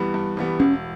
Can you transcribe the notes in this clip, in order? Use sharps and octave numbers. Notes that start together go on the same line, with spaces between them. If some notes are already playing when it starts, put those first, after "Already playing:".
Already playing: G2 E3 G3 B3
G2
E3 G3 B3
E1 C#4